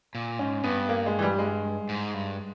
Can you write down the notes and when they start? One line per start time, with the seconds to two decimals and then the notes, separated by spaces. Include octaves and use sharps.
0.15 A#2
0.39 G#2 C#4
0.64 G2 B3
0.89 A#3
1.06 G#3
1.19 E3
1.22 G3
1.39 G#3
1.89 G#2
2.14 G2